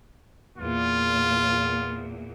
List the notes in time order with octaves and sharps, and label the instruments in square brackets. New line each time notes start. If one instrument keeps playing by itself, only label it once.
[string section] E2 A#2 [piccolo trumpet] F4